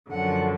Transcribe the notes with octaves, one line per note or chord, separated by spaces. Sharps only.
F#2 D3 F3 F#5